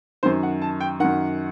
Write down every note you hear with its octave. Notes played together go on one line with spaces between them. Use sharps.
F#2 D#3 C5
F#5
A5
G5
F#2 D#3 F#5